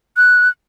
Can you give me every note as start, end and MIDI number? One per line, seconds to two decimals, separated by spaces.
0.17 0.49 90